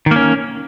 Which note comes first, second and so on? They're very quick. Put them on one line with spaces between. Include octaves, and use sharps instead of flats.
D#3 A#3 C#4